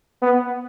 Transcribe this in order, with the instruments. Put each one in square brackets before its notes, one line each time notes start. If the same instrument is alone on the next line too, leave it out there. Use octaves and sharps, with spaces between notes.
[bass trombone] B3